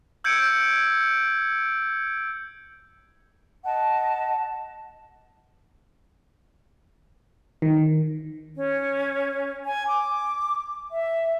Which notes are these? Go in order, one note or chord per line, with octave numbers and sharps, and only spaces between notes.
E6 G6 G#6 C#7 D7
D#5 F#5 A5
D#3
C#4
G#5
D6
E5